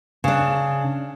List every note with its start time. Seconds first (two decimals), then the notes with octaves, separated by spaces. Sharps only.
0.24 C#3 D4